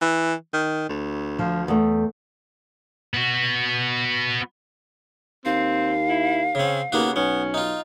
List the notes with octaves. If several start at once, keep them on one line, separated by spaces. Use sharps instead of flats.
E3
D#3
D2
F3
E2 A3
B3 F#4
D#2 C4 F5
E4
C#3 C4 C#4
D#2 C#3 A#3 B3 F#4
B1 B3 C#4
D#4 F4